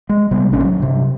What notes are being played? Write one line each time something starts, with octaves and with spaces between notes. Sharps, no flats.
G#3
C3 G3 B3
A#1 A#2 D3 C#4
F#3
G2 C3